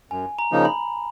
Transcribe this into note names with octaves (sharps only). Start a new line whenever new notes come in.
F#2 G#5
A#5
C#3 F3 A#3 D#4
B5